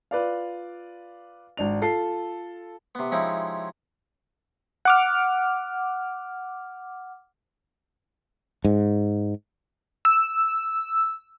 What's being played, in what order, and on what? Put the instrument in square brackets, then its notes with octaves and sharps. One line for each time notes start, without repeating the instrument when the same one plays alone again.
[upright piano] F4 B4 D5 F5
G#1 D4 F7
F4 A4 C7
[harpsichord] C3 B3
C3 F3 G#3 C#4 D#4 E4
[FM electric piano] F#5 D6 F6
[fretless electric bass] G#2
[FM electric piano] E6